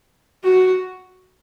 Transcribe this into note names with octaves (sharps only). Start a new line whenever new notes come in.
F#4